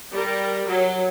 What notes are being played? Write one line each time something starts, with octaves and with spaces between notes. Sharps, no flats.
G3 A#4
F#3